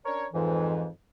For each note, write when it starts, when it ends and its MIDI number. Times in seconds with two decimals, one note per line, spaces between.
0.05 0.27 61
0.05 0.27 62
0.05 0.27 70
0.05 0.27 73
0.33 0.87 41
0.33 0.87 44
0.33 0.87 52